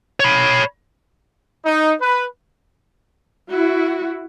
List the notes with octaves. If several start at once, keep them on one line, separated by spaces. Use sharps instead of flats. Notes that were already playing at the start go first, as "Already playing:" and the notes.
C#5 B5
D#4
B4
E4 F#4